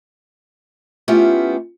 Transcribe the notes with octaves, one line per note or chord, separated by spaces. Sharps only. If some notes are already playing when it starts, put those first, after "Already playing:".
A3 B3 C#4 E4 F4 G4